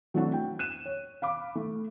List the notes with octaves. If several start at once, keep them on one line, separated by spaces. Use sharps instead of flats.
F#3 A3 C4 D4 E4 F#4
G5
F#6 D#7 E7
C#5
F5 B5 D6
A3